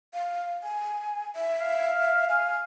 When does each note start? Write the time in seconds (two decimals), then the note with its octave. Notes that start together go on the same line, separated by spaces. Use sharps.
0.14 F5
0.63 G#5
1.35 E5
1.61 F5
2.29 G#5